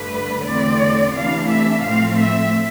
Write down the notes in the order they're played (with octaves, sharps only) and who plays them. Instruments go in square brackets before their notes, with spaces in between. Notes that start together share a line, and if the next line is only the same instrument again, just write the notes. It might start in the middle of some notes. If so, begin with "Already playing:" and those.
Already playing: [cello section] G2 D3 A3 B4
E2 D3 A3 C4 D5
C3 E3 A3 D4 F5
E5
A2 F3 A3 C4 F5
E5